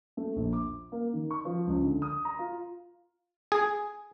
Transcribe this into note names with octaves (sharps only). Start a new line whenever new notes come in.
A3
A#1
D6
A#3
D#3
C#6
F3
C#2
D3
D#6
A#5
F4
G#4